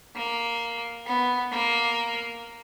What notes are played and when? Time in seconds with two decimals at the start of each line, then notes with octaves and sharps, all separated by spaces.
0.15 A#3
1.06 B3
1.52 A#3